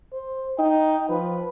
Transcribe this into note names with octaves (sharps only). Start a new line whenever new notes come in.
C5
D#4 G5
F3 B4